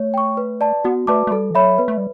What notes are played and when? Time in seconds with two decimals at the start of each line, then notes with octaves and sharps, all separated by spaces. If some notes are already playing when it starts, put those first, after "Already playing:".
Already playing: A3 C#5
0.14 G5 C#6
0.37 B4
0.61 D5 A5
0.84 B3 F#4
1.07 A3 B4 D5 A5 D6
1.27 A3
1.31 G3 A4
1.51 E3
1.55 F#3 C#5 E5 B5
1.78 B3 B4
1.88 A3
1.98 G3